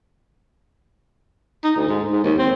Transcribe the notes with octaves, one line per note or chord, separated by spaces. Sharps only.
D#4
D2
G#2
G#2
D#2
C4